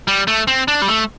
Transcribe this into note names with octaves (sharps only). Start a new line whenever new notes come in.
G3
A3
C4
D4
G3
A3